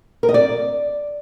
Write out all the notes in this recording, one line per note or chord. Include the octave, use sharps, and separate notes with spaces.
A#4
D#5
D5